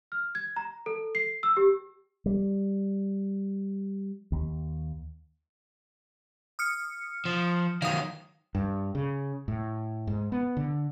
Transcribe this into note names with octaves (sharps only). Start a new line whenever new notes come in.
F6
G#6
A#5
A4
C7
E6
G4
G3
D#2
D#6 F6 C#7
F3
D#3 F#3 F5 D#6
G2
C#3
A2
G#2
B3
D3